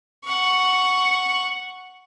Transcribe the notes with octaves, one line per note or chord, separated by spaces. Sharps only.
F#5 C#6